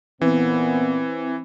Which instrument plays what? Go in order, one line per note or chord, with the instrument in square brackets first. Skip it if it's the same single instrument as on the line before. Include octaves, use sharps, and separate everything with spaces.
[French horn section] A#2 B3 [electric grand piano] E3 [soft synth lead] C4